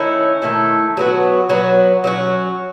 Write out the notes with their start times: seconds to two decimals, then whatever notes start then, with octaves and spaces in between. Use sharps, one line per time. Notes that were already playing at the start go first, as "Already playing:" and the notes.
Already playing: D#3 A3 C#4 E4
0.42 D#3 A3 C#4 E4
0.97 F#3 B3 F#4
1.49 F#3 B3 F#4
2.04 F#3 C#4 F#4